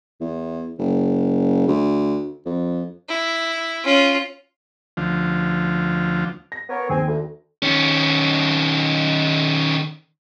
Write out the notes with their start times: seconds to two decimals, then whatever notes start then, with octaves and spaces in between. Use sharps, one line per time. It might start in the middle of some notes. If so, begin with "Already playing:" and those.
0.20 E2
0.79 F#1
1.67 D2
2.45 F2
3.08 E4
3.84 C#4 F4
4.97 D2 F3
6.52 A#6
6.70 B3 A#4 C#5
6.89 D#2 C4 G#5
7.08 D2
7.63 D#3 C#4